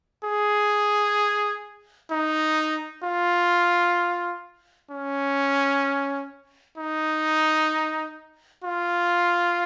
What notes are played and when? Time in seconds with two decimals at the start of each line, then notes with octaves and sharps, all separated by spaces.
0.24 G#4
2.11 D#4
3.04 F4
4.91 C#4
6.78 D#4
8.64 F4